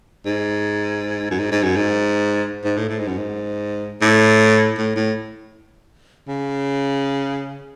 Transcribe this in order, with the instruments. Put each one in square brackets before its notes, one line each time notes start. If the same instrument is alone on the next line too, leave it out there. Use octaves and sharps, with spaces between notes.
[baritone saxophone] G#2
F#2
G#2
G#2
F#2
G#2
G#2
A2
A2
G#2
F#2
G#2
A2
A2
A2
C#3